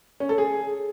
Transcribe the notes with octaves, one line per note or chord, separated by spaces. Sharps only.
C#4
A4
G#4